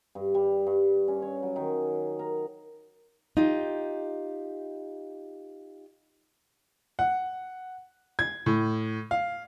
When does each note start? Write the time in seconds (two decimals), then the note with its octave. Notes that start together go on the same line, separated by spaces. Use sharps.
0.15 G2
0.35 G3
0.67 G2
1.08 C#4
1.22 C#5
1.43 F#3
1.56 D#3
2.19 A#4
3.37 D#4 F4 G4
6.99 F#5
8.19 G#6
8.46 A2
9.11 F5